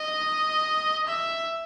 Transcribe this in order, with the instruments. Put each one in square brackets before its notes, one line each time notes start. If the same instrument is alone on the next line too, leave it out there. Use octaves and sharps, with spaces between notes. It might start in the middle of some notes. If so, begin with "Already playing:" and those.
Already playing: [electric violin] D#5
E5